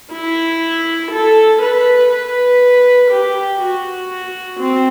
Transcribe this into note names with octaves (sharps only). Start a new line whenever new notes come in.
E4
A4
B4
B4
G4
F#4
C4